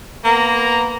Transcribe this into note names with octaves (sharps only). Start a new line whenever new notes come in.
A#3 B3 A#5